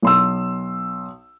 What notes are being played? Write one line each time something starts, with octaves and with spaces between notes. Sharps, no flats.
B1 C6 E6